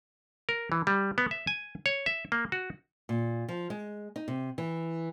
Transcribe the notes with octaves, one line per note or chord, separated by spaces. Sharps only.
A#4
E3
G3
B3
E5
G#5
C#5
E5
A#3
F#4
A#2
F3
G#3
D#4
C3
E3